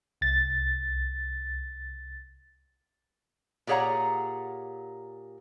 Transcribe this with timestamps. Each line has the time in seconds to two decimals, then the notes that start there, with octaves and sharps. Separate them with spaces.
0.21 C2 A6
3.67 A#2 G4 G#4 C#5 F#5 A#5